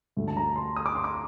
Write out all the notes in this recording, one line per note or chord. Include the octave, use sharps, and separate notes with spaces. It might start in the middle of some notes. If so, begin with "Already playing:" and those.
D2 D3 A3
A5
A#5
C6
D#6
D6
C6
D6